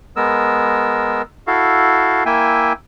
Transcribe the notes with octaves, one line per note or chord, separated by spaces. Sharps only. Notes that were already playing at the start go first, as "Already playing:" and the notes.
G#3 B3 A#4 E6
E4 F#4 A4 F5
A#3 E4 E5 G5 G#5